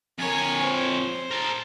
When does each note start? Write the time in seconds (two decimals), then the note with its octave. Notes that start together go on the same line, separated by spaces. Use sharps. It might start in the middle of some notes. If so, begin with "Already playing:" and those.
0.18 F2 A#4 C#5 G#5
0.62 C5
1.31 A#4 A5